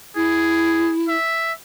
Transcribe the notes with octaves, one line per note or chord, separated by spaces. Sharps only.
E4 G#4
E5